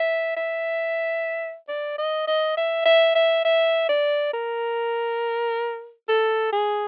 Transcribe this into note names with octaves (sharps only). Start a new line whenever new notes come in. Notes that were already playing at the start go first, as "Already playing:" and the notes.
Already playing: E5
E5
D5
D#5
D#5
E5
E5
E5
E5
D5
A#4
A4
G#4